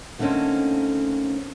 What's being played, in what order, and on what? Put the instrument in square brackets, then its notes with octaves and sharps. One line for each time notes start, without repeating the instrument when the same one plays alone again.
[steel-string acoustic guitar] D3 A3 A#3 C4 C#4 D#4